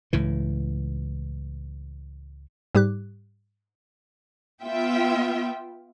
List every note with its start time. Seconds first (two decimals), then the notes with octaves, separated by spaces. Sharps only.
0.13 C#2 A2 E3
2.75 G#2 G3 G4 D6 F#6
4.63 B3 F4 E5 G5